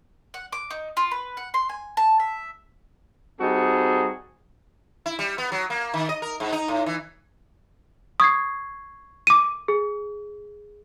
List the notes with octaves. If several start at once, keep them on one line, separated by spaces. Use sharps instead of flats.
F#5
D6
D#4
F4
B4
F#5
C6
G#5
A5
E5
G3 C4 D#4 F#4 G#4 A4
E4
G3
B3
F#3
A#3
D#3
D#5
A#4
G#2
D#4
A2
E3
C#6 D#6 G#6 C7
D6 D#7
G#4